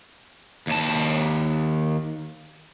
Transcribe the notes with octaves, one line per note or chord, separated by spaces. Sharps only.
D#2 A5